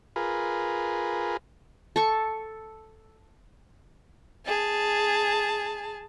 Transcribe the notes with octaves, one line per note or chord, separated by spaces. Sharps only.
F4 G#4 A#4 B4
A4 C#6
G#4 A5